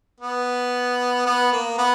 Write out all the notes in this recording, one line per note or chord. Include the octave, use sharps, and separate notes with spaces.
B3
B3
A#3
B3